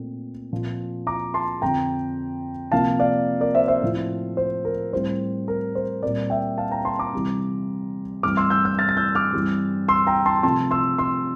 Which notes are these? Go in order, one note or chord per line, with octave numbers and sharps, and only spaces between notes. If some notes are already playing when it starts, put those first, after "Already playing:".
Already playing: A#2 A3 C4
A#2 F3 C4
A#5 D6
A5 C6
F2 D3 F3 C4 G5 A#5
C3 F3 A#3 F5 A5
D5 F5
A#4 D5
C5 E5
C5 E5
A2 F3 C4
C5
A#4
A2 G3 C4 C5
A#4
C5
A#2 G3 C4 A#4 D5
E5 G5
F5 A5
G5 A#5
A5 C6
A#5 D6
C3 E3 G3 C4
G2 E3 A3 C4 D6 F6
C6 E6
E6 G6
E6 G6
F6 A6
A6
E6 G6
D6 F6
G2 E3 G3 C4
C6 E6
G5 A#5
A5 C6
C3 F3 A3 A5 C6
C6 E6
C6 E6